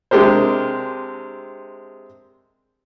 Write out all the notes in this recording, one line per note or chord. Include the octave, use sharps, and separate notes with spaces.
C3 G#3 D4 G4 A#4 C5